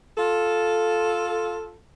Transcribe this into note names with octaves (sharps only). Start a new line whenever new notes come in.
F4 A4